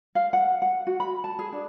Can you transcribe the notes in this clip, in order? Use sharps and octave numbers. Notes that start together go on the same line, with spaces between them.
F5
F#5
F#5
F#4
B5
A5
G#4
D4